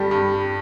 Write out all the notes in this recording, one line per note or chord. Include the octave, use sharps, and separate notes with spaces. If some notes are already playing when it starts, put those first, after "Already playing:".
Already playing: G2 G3 G4 A4
G2